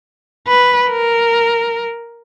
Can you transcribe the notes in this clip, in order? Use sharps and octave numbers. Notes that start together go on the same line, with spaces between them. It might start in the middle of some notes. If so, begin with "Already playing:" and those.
B4
A#4